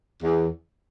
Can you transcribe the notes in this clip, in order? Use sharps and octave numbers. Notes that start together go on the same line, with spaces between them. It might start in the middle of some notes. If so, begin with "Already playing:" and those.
E2